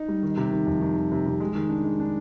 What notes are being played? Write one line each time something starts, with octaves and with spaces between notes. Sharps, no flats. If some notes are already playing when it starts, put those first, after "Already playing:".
Already playing: D#4
G3
D#3
C3
D#3
F2
D#3
D#3
C3
C3
G#3
D#3
D4
G#3
D4